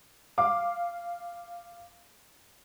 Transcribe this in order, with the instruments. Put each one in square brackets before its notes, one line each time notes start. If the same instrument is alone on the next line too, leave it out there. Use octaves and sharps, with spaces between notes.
[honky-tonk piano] F5 D6